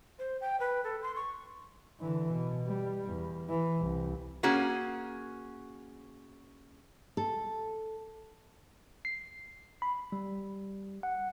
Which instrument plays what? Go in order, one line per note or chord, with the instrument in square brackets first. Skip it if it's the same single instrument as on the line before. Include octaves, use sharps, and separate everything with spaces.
[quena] C5
G5
B4
A4
C6
C#6
[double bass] D3 E3
B2
G3
E2
E3
C2
[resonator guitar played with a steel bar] A#3 C#4 F#4 G#4
[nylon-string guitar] A4
[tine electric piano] C7
B5
G3
F#5